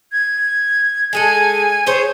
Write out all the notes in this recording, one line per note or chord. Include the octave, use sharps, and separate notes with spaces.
G#6
G#3 G#4 A4 G#5
G#4 C5 C#5